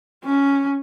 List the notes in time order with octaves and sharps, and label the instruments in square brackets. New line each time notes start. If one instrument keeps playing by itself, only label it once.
[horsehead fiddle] C#4